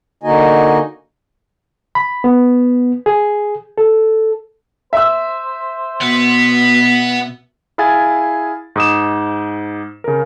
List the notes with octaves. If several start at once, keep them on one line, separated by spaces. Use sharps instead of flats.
D3 A#3 D#4 F#4 D#5 G#5
B5
B3
G#4
A4
C5 E5 E6
B2 B3
E4 G#4 F5 G#5 A6
G#2 D#6 E7
C#3 A#4